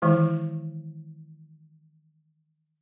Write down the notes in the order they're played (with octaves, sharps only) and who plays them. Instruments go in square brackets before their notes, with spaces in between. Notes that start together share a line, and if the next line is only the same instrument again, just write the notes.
[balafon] D#3 E3 G#3 E4